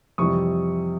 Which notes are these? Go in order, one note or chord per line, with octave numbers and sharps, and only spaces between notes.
F2 C3 E3 G3 C#6 D#6